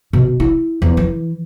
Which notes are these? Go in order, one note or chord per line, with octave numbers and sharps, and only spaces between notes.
B2
E4
E2
E3